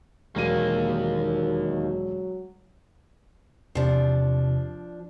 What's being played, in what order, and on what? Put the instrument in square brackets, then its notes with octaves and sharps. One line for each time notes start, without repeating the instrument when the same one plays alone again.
[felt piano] E1 D#7 [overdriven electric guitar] D#2 A#3 [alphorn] F#3
[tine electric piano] E2 C3 [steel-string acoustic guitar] F3 D4